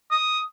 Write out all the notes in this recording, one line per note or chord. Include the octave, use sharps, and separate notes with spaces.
D#6